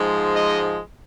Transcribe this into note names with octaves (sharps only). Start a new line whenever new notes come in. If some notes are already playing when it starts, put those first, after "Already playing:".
Already playing: G#2 F3 G#3
D#5